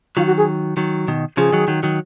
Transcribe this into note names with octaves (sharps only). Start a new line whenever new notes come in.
D#3 F#3 F4
F#4
G#4
D#3 F#3
B2 D#3
C#3 F3 G#4
D#3 F#3
D#3 F#3
D#3 F#3